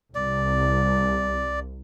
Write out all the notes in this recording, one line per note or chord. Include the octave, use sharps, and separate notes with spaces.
C2 D5